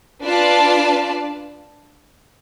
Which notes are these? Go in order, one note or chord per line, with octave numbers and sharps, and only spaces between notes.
D4 F4 B4 D5 A5